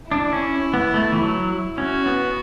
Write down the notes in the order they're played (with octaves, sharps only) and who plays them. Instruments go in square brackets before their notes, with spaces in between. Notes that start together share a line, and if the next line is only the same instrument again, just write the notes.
[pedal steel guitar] D4 [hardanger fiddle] E4
[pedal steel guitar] C#4
B3
A3
E3
F#3
[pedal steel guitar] C#4 [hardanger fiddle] F#4
[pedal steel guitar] B3